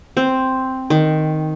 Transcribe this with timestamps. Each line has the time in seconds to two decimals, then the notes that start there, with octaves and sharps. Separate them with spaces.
0.17 C4
0.90 D#3